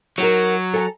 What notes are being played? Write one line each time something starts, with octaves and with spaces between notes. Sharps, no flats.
F#3 D#4 F#4 A#4
A4 G#5 A#5